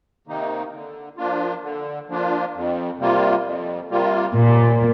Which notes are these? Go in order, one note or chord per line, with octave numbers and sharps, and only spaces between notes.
C3 D#3 A#3 D#4
D3
F3 A#3 D4 F4
D3
F3 A#3 D4 F4
F2
C3 G3 A#3 F4
F2
C3 G3 A#3 F4
D#2 A#2